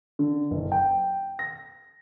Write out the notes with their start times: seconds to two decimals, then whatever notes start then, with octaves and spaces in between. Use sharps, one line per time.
0.19 D3
0.51 F#1
0.72 G5
1.39 A#6